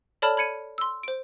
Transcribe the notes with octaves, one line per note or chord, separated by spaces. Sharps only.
A4 C#5 D5 A5 B5 F6
B5 G#6 C#7 D#7
C6 E6
C5 D7